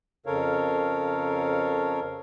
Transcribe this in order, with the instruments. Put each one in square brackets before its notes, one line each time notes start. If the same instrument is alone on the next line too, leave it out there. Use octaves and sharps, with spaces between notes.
[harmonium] F2 C#3 A4 A#4 C#5 F5